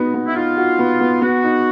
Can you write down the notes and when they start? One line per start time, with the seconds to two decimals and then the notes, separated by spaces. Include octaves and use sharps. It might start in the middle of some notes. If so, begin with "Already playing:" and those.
Already playing: B3 D#4 F#4
0.14 B3
0.27 E4
0.35 D#4 F4
0.57 F#4
0.79 B3
1.00 B3
1.22 B3 F#4
1.44 D#4